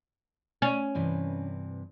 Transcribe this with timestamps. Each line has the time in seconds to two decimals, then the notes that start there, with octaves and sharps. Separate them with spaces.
0.62 C#4
0.95 G2 C3 E3